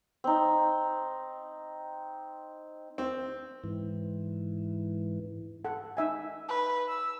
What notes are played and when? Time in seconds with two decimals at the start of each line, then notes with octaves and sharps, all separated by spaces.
0.24 C4 D#4
2.98 C4
3.64 G#2 E3
5.65 A4 F#5
5.97 D#4 E5 G#5
6.48 B4
6.89 E6